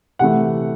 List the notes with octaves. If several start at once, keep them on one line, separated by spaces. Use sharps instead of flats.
C3 E3 A3 F#5